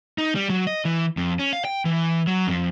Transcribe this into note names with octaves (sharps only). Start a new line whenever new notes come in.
D#4
G3
F#3
D#5
E3
F2
C#4
F5
G5
E3
F#3
F2